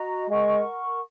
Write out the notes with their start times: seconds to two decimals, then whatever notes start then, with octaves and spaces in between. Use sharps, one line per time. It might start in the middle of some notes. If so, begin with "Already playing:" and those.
Already playing: F#4 D#5 A#5
0.30 G#3 A#4 F#5 C#6